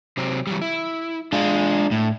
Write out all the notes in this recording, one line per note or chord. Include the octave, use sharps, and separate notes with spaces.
C3 F#3 C4
E3 F#3 G3
E4
G#3 D4 F4
A2